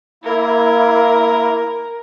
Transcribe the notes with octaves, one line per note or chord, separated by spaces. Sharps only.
A#3 E4 A#4